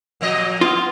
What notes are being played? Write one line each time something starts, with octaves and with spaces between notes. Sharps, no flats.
A#2 F3 D#5
B3 F4